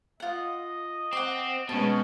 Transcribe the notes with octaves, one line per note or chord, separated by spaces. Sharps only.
F4 D#5 F#5
C4 F#5 D6
B2 G#3 B3 C#4 A5